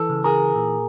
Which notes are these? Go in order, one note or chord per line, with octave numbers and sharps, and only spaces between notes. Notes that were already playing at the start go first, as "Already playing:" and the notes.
Already playing: E3 A4
C#3
G#4 A#4
A#2